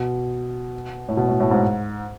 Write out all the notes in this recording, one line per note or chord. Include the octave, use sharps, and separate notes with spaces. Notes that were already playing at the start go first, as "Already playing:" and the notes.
Already playing: B2
A2
B2
A2
A2
G#2